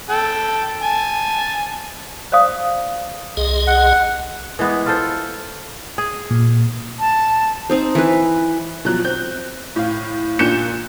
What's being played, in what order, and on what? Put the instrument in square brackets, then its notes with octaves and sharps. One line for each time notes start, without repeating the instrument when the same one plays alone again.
[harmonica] A4 G5
G#5 A5
[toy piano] C5 D5 F5 D#6
[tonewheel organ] C2 G#4 D#5
[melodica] F#5
[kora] E3 G#3 B3
F4 A4 C5
G#4
[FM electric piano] A#2
[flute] A5
[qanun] C4 D#4 C5
E3 B4
[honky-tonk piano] B2 F3 F#3 F#6
C4 G6
A2 F5
A#2 D4 F#6 G6 C#7 E7